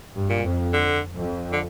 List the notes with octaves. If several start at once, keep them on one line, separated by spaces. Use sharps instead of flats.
G2
A#2
F2
D3
F2
D3